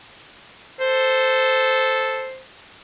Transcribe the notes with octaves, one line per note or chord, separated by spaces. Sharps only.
A4 C5